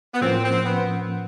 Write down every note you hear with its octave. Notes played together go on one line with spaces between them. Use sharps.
B3
A2 F3 A#3 C4 C#4
C4
B3